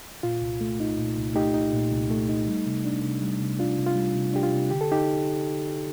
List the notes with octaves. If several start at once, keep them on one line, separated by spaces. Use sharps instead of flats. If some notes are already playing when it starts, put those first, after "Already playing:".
A#2 F4
C2
A3
D#4
A#2
C2
A3 D#4 G4
D#4
A#2
C2
A3
D#4
G3
C3
D4
C3
G3
C3
D4 F4
C3
F4
G3
C3
D4 G4
F4
C3
D3 G4
A4
D#4 G4